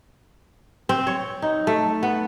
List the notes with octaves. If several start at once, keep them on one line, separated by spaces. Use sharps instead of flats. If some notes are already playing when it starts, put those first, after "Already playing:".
C4
C#5
D#4
A3
B3